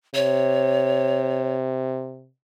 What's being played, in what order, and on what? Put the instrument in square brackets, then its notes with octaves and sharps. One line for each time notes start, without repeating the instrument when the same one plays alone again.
[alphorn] C3 [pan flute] C#5